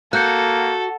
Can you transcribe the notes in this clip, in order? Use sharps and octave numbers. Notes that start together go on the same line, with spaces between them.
A#3 F#4 A4 F#6 G6 C#7